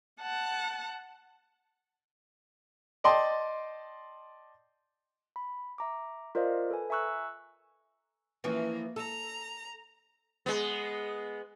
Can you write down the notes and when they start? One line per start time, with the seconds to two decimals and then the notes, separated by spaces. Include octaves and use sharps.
0.21 F#5 A5
3.04 D5 D#5 G5 A5 C6
5.36 B5
5.78 E5 A#5 D6
6.35 F4 A#4 C5 D5 D#5 F5
6.70 A4 B4 G#5
6.90 E5 G#5 A#5 C#6 E6 F#6
8.44 E3 F3 A#3 C#4
8.96 A4 A#5
10.46 G#3 B3